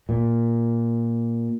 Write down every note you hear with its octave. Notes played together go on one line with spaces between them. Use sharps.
A#2